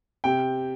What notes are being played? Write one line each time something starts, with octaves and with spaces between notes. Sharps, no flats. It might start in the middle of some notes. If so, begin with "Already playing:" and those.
C3 G5